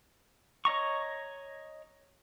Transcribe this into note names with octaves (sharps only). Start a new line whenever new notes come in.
C#5 D#5 A#5 C#6